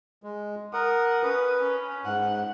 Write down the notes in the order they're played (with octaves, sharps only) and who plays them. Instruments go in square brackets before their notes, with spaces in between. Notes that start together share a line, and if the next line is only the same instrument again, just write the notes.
[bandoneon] G#3
[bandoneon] A#4 F#5 [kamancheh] D#6
[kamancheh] C#4 D#6 [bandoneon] B4
[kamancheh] C#4
[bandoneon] G#2 [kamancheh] F#5